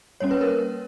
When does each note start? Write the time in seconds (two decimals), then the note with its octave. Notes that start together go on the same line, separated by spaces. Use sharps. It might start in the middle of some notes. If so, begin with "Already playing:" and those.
0.20 G3 A#3 C#4 C#5
0.31 B4
0.41 A#4